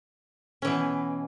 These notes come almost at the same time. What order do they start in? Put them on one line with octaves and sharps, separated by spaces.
C#4 E3 B2